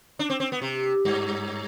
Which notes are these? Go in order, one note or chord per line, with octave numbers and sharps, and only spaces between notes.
D4
C4
C4
B3
C3
G2